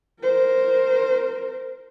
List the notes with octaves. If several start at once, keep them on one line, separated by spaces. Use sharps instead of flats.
A#4 C5